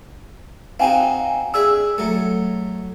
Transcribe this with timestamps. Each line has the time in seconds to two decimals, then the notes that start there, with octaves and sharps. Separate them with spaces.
0.80 C4 D#4 F#4 F5 G5 G#5
1.54 D4 G#4 E5 E6
1.98 F#3 A3